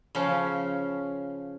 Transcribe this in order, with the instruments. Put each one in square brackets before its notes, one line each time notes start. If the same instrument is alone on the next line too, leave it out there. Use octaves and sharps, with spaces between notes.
[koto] C#3 F3 C#4